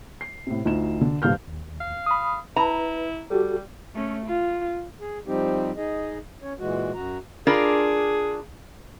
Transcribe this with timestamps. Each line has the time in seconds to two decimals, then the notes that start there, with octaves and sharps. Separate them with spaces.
0.21 C7
0.47 A2 C3
0.65 D2 D#4 F4 E7
1.01 D3
1.22 D#1 G2 D3 F5 F6 G6
1.48 D#2
1.80 F5
2.06 B5 D#6
2.56 E4 B4 A#5
3.30 G3 F#4 G4 A4
3.95 A3 C#4
4.26 F4
5.01 G#4
5.27 F3 G3 C4 D#4 G4
5.77 D#4 G#4 D#5
6.42 C#4 C#5
6.59 A#2 E3 G#3 F#4
6.95 F#2 F#4 A#5
7.47 D4 F4 G#4 A#4